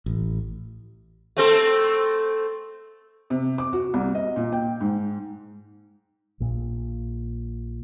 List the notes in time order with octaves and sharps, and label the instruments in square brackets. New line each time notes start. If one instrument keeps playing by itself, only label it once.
[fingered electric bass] A1
[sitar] A3 C4 A4
[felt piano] C3
D6
F#4
C2
D#5
A#2
G5
G#2
[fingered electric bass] A#1 A#2